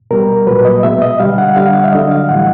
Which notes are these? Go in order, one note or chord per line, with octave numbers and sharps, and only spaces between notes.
B2 G3 A#4
A#2 F#3 B4
D#5
B2 G#3 E5
D#5
D3 G3 F5
F#5
D3 G3 F5
F#5
F5
E5
D3 F#3 D#5
F5
A2 E3 G3 F#5